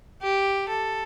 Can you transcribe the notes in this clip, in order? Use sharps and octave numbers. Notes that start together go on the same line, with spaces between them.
G4
A4